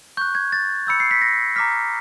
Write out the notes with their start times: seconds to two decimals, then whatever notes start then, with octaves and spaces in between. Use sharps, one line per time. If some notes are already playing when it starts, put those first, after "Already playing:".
0.17 C#6 F#6 G6
0.35 G#6
0.52 A6
0.87 B5 E6 G6 C#7
1.00 C7
1.11 B6
1.22 A#6
1.56 A#5 D6 F6 B6